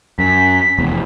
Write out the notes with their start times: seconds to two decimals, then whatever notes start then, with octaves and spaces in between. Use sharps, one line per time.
0.19 F#2 B6
0.79 F1 E2